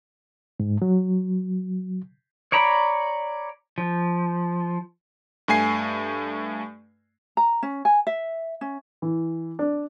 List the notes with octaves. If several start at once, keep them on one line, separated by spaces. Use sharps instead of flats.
G#2
F#3
C#5 D5 A#5 B5
F3
G2 A3 G#5 C7
A#5
C#4
G#5
E5
C#4
E3
D4